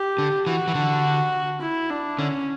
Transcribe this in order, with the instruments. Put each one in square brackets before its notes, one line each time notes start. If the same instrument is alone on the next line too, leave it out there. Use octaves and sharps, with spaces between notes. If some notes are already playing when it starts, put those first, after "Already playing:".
Already playing: [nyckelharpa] G4
[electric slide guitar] D3
[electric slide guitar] E3 [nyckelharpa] F#4
[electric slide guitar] E3
D3
[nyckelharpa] E4
D4
[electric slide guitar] D3 [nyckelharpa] C#4